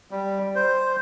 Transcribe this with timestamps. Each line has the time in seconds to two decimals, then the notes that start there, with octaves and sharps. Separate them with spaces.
0.11 G3
0.55 C5